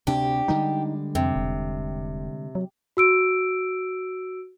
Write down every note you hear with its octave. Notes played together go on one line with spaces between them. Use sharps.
D2 C3 D4 G4
D3 G3 G#3 D#4
F2 C3
E1
F#3
F#4 E6 D7